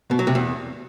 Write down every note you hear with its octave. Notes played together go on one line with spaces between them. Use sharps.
B2
F#3
C3
E2